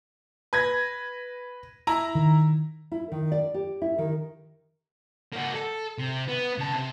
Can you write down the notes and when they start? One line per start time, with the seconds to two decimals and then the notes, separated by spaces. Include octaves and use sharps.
0.53 B4 G#6 A#6
1.87 E4 A#5
2.15 D#3
2.92 E4
3.12 D#3
3.32 D5
3.54 G4
3.82 E4
3.98 D#3
5.32 A#3 F#4
5.55 A4
5.98 C3
6.28 B3
6.58 C#3 A5
6.73 C3